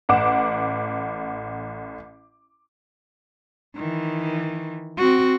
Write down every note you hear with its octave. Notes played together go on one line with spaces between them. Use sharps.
A1 F#5 D6 E7
D#3 E3
C4 F#4